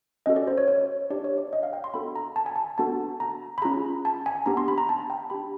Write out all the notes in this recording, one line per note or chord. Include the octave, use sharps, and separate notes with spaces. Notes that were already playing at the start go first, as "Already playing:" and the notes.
C#4 F#4 A4 D#5
D5
C5
C#5
C#5
D4 G4 D5
C#5
D5
D#5
F5
G5
C6
B3 D4 F#4 A4 B5
A#5
A5
G#5
A5
B3 D4 F#4 A4 A5
A#5
B5
C#4 F4 G#4 A#5
A5
G#5
B3 D4 G4 A#5
C6
B5
A#5
A5
G5
D4 G4 B5